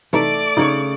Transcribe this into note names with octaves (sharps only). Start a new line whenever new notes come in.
C3 E3 A3 D#4 D5 D6
C#3 D#4 C#5